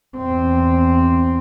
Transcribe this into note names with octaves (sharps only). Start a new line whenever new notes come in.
E2 C4